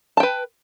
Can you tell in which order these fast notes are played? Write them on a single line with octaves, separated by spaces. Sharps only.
A5 G5 B4